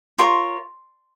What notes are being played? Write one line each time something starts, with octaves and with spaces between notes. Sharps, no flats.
F4 A#4 C#5 C6